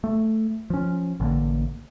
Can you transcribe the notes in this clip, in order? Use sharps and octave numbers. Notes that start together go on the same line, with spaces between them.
A3
F3 C#4
A1 D3 A#3